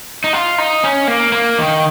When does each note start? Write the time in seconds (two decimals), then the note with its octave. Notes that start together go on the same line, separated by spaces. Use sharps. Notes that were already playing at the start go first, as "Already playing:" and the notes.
0.24 D#4
0.33 F4
0.58 D#4
0.84 C#4
1.08 A#3
1.32 A#3
1.58 D#3